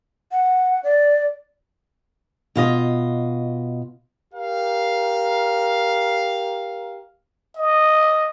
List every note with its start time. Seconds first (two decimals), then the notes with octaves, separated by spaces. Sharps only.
0.32 F#5
0.84 D5
2.55 B2 F4 D#5
4.34 G4 A#4 F5
7.56 D#5